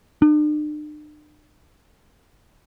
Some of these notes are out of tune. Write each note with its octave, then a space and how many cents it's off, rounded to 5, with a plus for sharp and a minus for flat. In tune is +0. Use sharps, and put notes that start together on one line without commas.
D4 +45